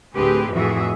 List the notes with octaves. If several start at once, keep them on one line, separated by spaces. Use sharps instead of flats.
D2 A2 C4 G4 G#4 B4
F2 A2 E3 F#4 G#4 E5